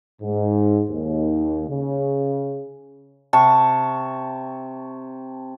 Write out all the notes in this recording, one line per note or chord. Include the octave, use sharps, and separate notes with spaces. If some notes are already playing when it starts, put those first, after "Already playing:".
G#2
D#2
C#3
C3 A5 C#6